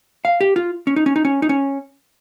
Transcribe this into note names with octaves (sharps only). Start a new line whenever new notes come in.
F5
G4
F4
C#4
D#4
C#4
D#4
C#4
D#4
C#4